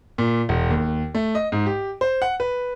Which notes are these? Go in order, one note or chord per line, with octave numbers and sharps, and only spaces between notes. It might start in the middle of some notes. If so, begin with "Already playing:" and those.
A#2
E1
D#2
A3
D#5
G#2
G4
C5
F#5
B4